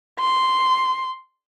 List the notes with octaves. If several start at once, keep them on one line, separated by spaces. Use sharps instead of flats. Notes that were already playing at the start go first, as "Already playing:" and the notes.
C6